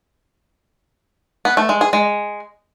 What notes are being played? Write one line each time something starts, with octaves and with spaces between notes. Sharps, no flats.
B3
A3
G#3
G#4
G#3